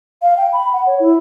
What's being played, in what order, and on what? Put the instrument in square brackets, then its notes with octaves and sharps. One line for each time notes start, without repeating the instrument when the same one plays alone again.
[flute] F5
G5
B5
F#5
C#5
E4